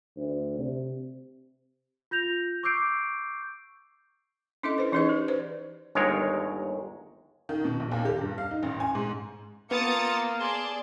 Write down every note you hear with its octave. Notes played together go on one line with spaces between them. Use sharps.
D2
C3
F4 G6 A#6 F7
C#6 D6 E6 G6 C7 D7
C#4 D4 E4 A4 D#5 C6
C#4 B4 C5
E3 C#4 D#4 G#4 B4 D#5
G4
B4 C5 D5
G1 D#2 G#3 A#4 C#5
D#3
B2
A#1
D#2
G4
G2
F5
D#4
A1
G#5
G#2
A#3 B3 F4 A5 A#5 D#6 A6 C#7
G#4 D5 A5 C6